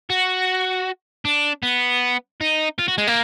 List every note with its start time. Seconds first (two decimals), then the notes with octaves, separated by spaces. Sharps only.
0.10 F#4
1.25 D4
1.63 B3
2.41 D#4
2.79 F4
2.88 F#4
2.98 G#3
3.07 A#3